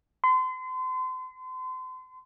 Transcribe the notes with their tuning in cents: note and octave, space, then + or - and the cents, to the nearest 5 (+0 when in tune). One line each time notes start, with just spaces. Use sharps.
C6 -35